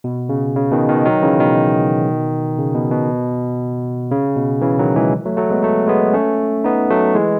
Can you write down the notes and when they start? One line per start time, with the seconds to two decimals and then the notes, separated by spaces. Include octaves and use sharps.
0.04 B2
0.29 C#3
0.56 C#3
0.71 B2 D#3
0.89 B2 D#3
1.05 D#3 F#3
1.22 C#3 E3
1.39 B2 D#3
2.58 C#3
2.75 B2
2.92 B2
4.11 C#3
4.36 B2
4.61 C#3 E3
4.79 D#3 F#3
4.96 E3 G#3
5.25 F#3 A3
5.37 F#3 A3
5.50 G#3 B3
5.63 F#3 A3
5.88 G#3 B3
6.13 A3 C#4
6.64 B3 D#4
6.90 F#3 A3
7.15 E3 G#3